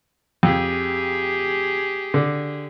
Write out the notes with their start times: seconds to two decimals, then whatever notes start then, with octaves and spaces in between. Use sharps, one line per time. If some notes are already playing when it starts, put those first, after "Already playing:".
0.43 F2 G4 G#4
2.14 D3